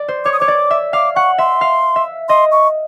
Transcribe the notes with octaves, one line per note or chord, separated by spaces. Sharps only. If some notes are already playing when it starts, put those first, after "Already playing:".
Already playing: D5
C5
C#5 D6
D#6
C#5 D6
D5
E5
F5 D6
F#5 C#6
E5 C6
F5
E5
D#5 C6
C#6